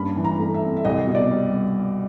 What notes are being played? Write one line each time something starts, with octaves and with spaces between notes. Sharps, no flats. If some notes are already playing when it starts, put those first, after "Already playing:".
Already playing: G2 A#3 C#4 B5
E3
A#5
A3
E5
C4
E5
C2 D#5
B2
D5
G3